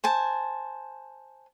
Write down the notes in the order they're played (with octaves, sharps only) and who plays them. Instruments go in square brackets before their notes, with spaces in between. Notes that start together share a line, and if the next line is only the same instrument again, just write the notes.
[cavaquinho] C5 G#5 A5